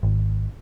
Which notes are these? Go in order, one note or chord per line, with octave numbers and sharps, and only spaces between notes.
G#1